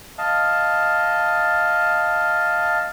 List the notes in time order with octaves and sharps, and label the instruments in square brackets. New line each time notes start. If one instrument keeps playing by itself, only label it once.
[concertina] D#5 F5 A5